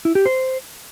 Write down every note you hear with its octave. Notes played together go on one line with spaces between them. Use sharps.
E4
G4
C5